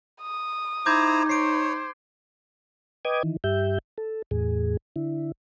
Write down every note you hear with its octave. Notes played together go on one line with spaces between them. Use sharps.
D#6
D#4 E4 C5 A#5 D6 G6 G#6
C5 C#5 C7 D7
B4 D#5 G5 D6 D#6 G#6
D#3 E3
G2 G4 E5 G6
A4
E2 A2 G#4
D3 E4